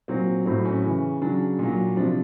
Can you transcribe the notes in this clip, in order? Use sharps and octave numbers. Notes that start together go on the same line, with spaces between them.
A#2 F#3 C4
A2 F#3 C4
C#4
C#3 E3
C#3 F#3 D4
A#2 F#3
C3 F3 D4